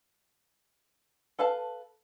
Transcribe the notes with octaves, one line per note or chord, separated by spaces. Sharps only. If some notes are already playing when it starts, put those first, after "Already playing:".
A4 B4 F5 A5